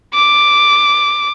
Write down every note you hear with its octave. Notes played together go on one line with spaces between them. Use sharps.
D6